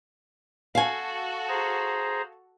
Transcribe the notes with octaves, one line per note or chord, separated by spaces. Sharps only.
F#4 A4 F5 G#5
G#4 C5 A#5